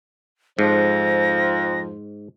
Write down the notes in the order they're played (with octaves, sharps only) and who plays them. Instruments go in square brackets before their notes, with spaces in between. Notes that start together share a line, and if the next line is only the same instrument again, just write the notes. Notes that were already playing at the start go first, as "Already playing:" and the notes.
[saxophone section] F2 F3 [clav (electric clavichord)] G#2 [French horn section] C5 [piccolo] A#6